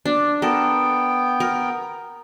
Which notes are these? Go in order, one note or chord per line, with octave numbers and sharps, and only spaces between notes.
D4
B3 A4 A#4 G5
A#4